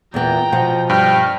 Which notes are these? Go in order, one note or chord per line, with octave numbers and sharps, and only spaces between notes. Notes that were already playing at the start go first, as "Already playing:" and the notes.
E2 A#2 B3 G5 A#5
B2 F3 F#5
G2 G5 F6